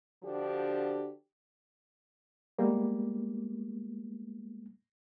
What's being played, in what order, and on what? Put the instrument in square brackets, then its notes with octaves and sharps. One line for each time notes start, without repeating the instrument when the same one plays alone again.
[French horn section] D3 F3 D4 F#4 G4
[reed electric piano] G3 G#3 A#3 B3